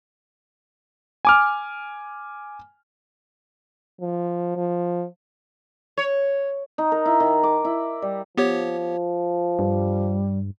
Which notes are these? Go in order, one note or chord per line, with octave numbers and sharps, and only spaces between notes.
G#5 D6 F6
F3
F3
C#5
D#4
A#4
E4
D#3
D6
E4
G3
F3 B3 G4 C#5
G2 G3